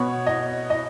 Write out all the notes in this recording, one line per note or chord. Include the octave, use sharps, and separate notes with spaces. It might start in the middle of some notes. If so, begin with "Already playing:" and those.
Already playing: B2 B3 C#5
D#5
D#5